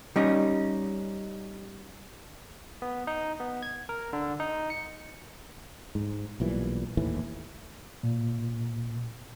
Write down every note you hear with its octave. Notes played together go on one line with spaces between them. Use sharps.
G3 C#4 D#4
B3
D#4
B3
G#6
A#4
D3
D#4
C#7
G#2
B1 A#2 E3 G3
A#1 D#2 A2 E3
A#2